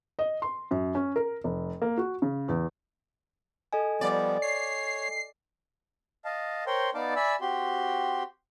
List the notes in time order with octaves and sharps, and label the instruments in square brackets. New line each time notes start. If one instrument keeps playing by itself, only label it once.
[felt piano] D#5
C6
F#2
C#4
A#4
F1
A#3
F#4
C#3
E2
[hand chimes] A4 D#5 G#5
[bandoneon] F3 G3 B3 [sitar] D5
[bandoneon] C#5 [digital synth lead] C7
[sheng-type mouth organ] D#5 F5 A5
A#4 C5 C#5 G5 C6
B3 D#4 D5 F5 A5 D6
D5 E5 G#5 B5 E6
C4 F#4 G4 C6